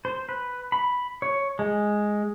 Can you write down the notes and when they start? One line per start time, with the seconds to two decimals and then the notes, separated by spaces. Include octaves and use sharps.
0.05 C5
0.29 B4
0.72 B5
1.22 C#5
1.59 G#3